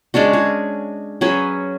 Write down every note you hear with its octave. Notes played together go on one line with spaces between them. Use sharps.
G#3 C#4 D4 F#4
G#4
F#3 C#4 G#4 B4